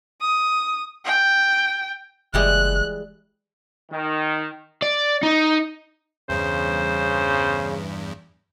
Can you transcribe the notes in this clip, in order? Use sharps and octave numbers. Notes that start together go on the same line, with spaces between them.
D#6
G5
F#1 E3 G3 G#3 F#6
D#3
D5
D#4
E2 G2 C#3 C5